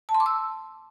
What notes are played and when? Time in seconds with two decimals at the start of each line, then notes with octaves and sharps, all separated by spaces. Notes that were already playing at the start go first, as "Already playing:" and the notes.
0.09 A5
0.14 C6
0.20 D6
0.26 E6